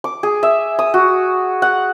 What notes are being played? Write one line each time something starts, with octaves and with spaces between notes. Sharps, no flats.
D6
G#4
E5
D#6
F#4
F#5